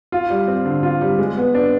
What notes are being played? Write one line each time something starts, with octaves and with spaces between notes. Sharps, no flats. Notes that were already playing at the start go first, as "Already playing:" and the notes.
F4
G3
C4
D3
F4
G3
G#3
B3
D4